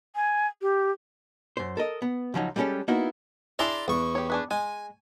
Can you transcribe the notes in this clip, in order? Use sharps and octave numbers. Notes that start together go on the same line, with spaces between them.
G#5
G4
F#2 C5
A4 A#4 D#5
B3
C#2 F3 F#3 D#4
G3 G#3 B3 C#4 G4 A4
A#3 B3 D#4 E4 F#4
D4 E4 G#4 D5 A#5 C6
E2 C#6
G4 C#5
D4 G#4 B4
G#3 G#5